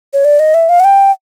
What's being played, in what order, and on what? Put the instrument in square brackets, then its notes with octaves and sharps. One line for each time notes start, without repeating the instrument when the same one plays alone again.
[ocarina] C#5
D5
D#5
E5
F5
F#5
G5